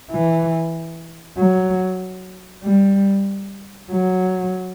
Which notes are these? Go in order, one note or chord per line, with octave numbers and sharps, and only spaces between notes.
E3
F#3
G3
F#3